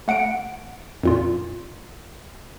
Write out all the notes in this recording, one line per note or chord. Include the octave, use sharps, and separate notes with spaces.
A3 F#5 C#7 D7
F2 A#2 F4